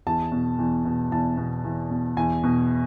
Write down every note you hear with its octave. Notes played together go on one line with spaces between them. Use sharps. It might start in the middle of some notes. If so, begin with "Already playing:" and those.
E2 A5
B2
E2
B2
E2 A5
B2
E2
B2
E2 G#5
B2